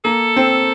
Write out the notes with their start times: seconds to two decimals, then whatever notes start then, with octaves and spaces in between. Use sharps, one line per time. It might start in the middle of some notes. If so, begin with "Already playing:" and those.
0.05 A#3 A4
0.36 C4